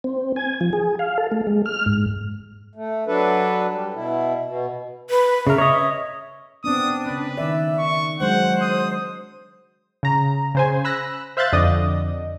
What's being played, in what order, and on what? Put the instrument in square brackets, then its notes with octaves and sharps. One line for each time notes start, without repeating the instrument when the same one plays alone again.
[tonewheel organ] C4
G#5
F3
G#4
F5
A4
A3
G#3
F6
G#2
[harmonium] A3
F#3 D4 A4 B4
G3
B2 E4
B2
[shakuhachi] B4
[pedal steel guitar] C#3 A#4 [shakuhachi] E5
[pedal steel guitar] C#5 D#5
[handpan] B3 C4 [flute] D4 [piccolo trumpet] D#6
[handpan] C#3 C#4 [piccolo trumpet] B4
[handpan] D#3 D5 [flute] E5
[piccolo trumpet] C#6
[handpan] F#3 G#3 D4 [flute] C5 [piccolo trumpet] F#5
[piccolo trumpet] D#6
[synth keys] C#3 A#5
C#3 C5 G#5
B5 E6 F#6 A#6
C5 E5 F5 F#6 G6 A6
F2 D3 D5 D#5 D#6